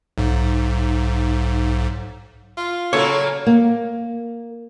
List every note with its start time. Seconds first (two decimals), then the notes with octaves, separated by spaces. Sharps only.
0.18 B1 G#2
2.57 F4
2.93 C#3 F#3 A#3 A4 C#5
3.47 A#3